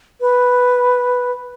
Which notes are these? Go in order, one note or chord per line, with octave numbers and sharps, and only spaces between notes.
B4